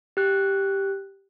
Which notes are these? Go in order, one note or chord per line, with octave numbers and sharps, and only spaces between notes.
G4 F#6